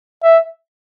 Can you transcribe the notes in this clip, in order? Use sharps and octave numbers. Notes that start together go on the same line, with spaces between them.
E5